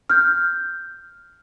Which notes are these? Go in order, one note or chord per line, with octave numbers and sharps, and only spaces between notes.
F6 G6